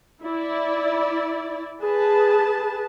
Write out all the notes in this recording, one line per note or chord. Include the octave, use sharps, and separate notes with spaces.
E4 D5
G#4 B4 A5